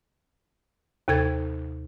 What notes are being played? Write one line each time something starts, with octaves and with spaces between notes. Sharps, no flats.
D#2 C3 A4 G#6